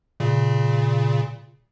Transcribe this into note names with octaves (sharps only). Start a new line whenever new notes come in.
A#2 C#3